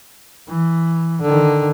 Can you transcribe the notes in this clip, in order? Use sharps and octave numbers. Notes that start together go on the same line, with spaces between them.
E3
D3 D#3